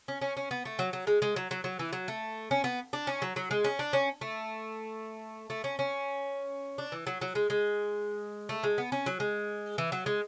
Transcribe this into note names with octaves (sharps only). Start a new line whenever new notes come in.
C#4
C#4
C#4
B3
A3
F#3
F#3
G#3
G#3
F#3
F#3
F#3
E3
F#3
A3
C#4
B3
D4
C#4
F#3
F#3
G#3
C#4
D4
C#4
A3
A3
C#4
C#4
D4
E3
F#3
F#3
G#3
G#3
A3
G#3
B3
C#4
F#3
G#3
E3
F#3
G#3